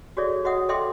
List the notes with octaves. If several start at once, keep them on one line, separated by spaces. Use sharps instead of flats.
F#4 G#4 A4 C#5 D5 E5
F#4 C#5 D#5 E5 F#5 D#6
A4 D#5 E5 G5 C6 D6